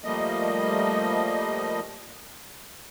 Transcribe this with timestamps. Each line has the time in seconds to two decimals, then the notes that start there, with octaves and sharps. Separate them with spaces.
0.04 F3 G3 A3 A#3 D#5